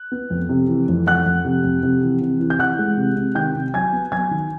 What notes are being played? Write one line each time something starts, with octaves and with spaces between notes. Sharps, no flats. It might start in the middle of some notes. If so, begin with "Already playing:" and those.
Already playing: F#6
B3
F2
C3
E3
F2
F2 F#5 F#6
F2
C3
F2
C3
E3
C3
E3
G6
E3 F#5 F#6
G#3
C3
C3
D#3 G5 G6
C3
F#3 G#5 G#6
B3
F#3 G#5 G#6
D#3